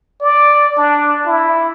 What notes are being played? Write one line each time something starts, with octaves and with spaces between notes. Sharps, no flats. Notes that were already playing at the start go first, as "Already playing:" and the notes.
D5
D4
E4